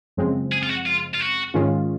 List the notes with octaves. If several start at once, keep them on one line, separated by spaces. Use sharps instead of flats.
F#2 C#3 F3 G#3 C4
G#4
F4
F#4
F4
F4
F#4
G#2 D#3 G#3 C#4 F4